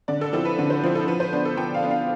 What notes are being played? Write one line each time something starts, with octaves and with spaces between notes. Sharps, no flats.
D3 D5
A4
F3 C4 E4 A4
B4
D3
C5
F3 C4 E4
A4
F3 B4
C5
B3 D4
A4
F3 G5
F5
B3 D4
F5